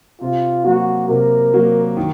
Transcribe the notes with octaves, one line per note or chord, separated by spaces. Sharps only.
C3 F4
F#3 A#3 F#4
C3 A#4
F#3 A#3
D#3